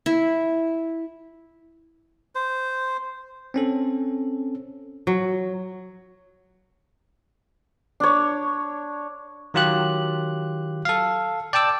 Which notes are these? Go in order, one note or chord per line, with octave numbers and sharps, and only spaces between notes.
E4
C5
C4 C#4 A4
F#3
D4 C#5
D#3 F#3 F4 G4 F#6
A4 F5
D5 G5 A5 D6 E6